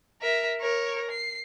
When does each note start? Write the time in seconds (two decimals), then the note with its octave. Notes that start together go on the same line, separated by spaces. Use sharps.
0.21 A#4 E5
0.60 A#4 C#5
1.11 C7